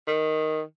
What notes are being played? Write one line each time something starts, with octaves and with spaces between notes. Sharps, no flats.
D#3